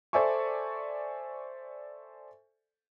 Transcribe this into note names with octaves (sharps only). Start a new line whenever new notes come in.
A4 C5 D5 E5 G#5 C#6